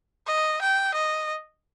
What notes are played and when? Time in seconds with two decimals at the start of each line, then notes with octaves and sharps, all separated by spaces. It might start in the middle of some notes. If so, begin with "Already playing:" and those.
0.27 D#5
0.62 G5
0.95 D#5